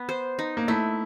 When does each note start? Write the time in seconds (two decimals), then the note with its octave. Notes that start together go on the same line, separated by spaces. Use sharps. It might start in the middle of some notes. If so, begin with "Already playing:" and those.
Already playing: B3
0.09 C5
0.39 D#4
0.57 A#3
0.68 A3 E4